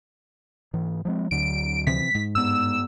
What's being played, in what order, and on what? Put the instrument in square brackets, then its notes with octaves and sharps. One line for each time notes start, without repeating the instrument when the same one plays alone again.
[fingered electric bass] G#2 E3
F3 G#3 C4
[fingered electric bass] D2 D3 F#3 [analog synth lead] D7
[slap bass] C3 E3 F3 [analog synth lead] B6
[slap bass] G#2
[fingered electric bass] G2 B3 [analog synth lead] E6